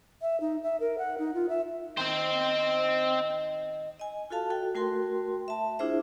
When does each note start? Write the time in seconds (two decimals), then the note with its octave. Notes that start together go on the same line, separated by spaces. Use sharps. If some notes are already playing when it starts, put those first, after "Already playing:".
0.21 E5
0.40 D#4
0.63 E5
0.80 A#4
0.98 F#5
1.18 D#4
1.34 F4
1.49 E5
1.97 D#3 C4 C5
3.99 D#5 G#5
4.30 F4 F#4 A4 F5 A5
4.50 F#4 A4 G5
4.75 A3 F#4 A#4 G5 C6
5.48 E5 A5
5.79 D4 E4 F4 G#4 C5 E5